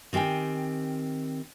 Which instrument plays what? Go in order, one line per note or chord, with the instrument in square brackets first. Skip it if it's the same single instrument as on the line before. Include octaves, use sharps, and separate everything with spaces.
[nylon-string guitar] D#3 C4 G4 G5 G#5